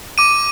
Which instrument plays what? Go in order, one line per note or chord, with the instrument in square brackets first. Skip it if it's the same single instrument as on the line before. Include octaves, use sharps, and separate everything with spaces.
[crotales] D6 D#7